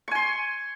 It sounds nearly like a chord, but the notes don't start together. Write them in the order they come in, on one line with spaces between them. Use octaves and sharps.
C#6 G#5 C6